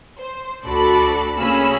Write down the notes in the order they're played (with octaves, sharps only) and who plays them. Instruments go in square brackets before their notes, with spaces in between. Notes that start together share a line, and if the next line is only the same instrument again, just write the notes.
[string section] C5
D2 F#4 A4 D5 B5
C#3 A#3 C#4 G#4 B5 E6